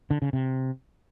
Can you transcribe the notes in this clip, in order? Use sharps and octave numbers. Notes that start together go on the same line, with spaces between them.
D3
C#3
C3